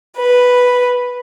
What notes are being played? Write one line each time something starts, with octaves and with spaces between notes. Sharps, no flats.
B4